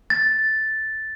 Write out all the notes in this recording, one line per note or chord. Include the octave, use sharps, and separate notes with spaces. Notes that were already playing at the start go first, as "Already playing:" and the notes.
A6